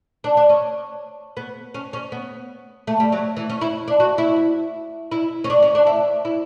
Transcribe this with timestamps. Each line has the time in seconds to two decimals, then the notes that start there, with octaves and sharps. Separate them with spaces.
0.24 D4
0.37 D4
0.49 C#4
1.37 B3
1.74 C#4
1.93 C#4
2.12 B3
2.87 A3
3.00 G3
3.12 F#3
3.37 E3
3.50 C#4
3.61 E4
3.88 D4
4.00 F#4
4.18 E4
5.11 E4
5.44 C#4
5.50 D4
5.62 C#4
5.75 D4
5.87 E4
6.25 E4